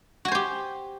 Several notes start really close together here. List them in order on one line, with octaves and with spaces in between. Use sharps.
F#4 G#5 C5 G4